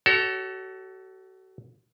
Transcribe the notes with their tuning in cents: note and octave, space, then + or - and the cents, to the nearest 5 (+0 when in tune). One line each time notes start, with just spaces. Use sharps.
F#4 +35 A4 +0 C#5 +0